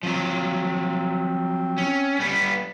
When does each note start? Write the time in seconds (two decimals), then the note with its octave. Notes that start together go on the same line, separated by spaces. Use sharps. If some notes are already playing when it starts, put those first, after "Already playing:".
0.03 F3 F#3 C4
1.78 C#4
2.20 G3 B3